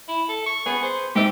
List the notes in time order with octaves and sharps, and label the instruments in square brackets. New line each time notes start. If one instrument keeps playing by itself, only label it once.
[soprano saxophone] E4
A4
C#6
[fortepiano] B3 [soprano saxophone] G#4
[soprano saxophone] C5
[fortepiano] G#2 D#4 E5 [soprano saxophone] G4